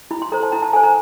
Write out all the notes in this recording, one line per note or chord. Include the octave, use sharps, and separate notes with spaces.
E4 B5
C6
A4 C5 A#5
A5
E4 A#5
A5
A4 C5 G#5
A#5